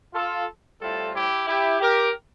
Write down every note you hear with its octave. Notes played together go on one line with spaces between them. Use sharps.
F4 A4
A2 G3 C4 E4 F4 A4
E4 G4
E4 G4
G4 A#4